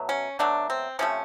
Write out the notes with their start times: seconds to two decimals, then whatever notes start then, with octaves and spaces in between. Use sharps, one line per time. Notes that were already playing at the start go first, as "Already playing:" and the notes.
Already playing: B2 F#3 A3
0.09 C#4
0.39 B2 F#3 A3 D4
0.70 C4
0.99 C3 F3 A3 C#4